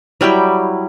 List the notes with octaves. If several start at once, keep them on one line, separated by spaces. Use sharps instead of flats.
F#3 G3 E4 G5